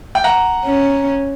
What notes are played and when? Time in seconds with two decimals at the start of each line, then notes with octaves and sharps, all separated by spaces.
0.15 G5
0.24 F#5 A#5
0.65 C#4